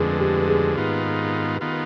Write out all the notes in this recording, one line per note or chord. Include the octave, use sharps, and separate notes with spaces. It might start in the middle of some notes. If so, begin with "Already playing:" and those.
Already playing: F2 D3 G#3 G#4 B4
G4
G#4
G#2 D#3 B3 F4
D#3 B3 F4